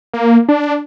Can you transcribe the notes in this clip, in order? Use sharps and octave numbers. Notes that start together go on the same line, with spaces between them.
A#3
D4